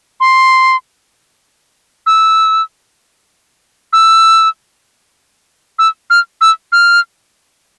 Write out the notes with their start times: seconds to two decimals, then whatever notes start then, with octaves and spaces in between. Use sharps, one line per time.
0.20 C6
2.06 E6
3.93 E6
5.79 E6
6.10 F6
6.41 E6
6.72 F6